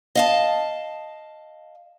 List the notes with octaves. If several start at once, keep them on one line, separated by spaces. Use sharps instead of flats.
D#5 F5 A5